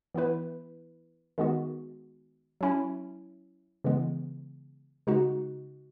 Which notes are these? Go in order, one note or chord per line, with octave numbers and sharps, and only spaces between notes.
E3 B3 E4 B4
D#3 G#3 B3 F#4
F#3 C#4 E4
C#3 E3 G#3 B3
C#3 G#3 D#4 F#4